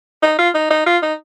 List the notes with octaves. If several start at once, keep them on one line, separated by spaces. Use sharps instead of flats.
D#4
F4
D#4
D#4
F4
D#4